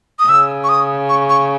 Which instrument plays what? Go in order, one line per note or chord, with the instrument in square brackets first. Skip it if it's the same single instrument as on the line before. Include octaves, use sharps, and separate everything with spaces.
[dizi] D#6
[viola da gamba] C#3 [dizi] E6
[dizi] C#6
D#6
C#6
C#6